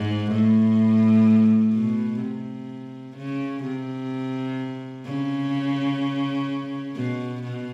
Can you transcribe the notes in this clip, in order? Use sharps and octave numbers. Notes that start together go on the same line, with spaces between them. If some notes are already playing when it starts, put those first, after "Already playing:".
Already playing: G#2
A2
B2
C3
C#3
C3
C#3
B2
B2